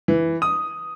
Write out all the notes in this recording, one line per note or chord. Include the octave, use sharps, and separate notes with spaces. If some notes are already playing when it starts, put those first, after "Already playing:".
E3
D#6